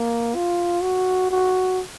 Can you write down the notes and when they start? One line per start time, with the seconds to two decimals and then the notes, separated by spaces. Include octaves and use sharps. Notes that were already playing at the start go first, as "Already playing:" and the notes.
Already playing: A#3
0.35 F4
0.83 F#4
1.31 F#4